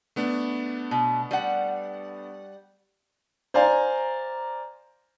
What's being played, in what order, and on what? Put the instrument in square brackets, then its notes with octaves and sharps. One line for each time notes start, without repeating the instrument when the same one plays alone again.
[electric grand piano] A3 B3 D4
[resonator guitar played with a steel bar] B2
G3 F#5
[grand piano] C5 D5 F5 G#5 A#5